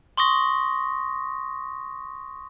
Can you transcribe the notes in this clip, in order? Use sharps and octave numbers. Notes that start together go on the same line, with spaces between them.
C6 C#6 D#6 A#6